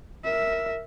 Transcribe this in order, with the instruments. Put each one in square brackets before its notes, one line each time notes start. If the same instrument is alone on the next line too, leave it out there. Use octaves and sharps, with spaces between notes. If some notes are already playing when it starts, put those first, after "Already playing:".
[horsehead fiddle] A#4 E5